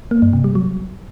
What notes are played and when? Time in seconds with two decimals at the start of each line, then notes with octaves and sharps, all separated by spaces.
0.11 A#3
0.22 G2
0.33 C3
0.44 G3
0.55 F#3